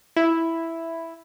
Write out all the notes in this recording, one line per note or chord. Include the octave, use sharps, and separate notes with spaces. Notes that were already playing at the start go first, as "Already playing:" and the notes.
E4